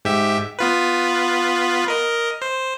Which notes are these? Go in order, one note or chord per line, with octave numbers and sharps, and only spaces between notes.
G#2 G4 E5
B3 F4 B4
A#4 D#5
C5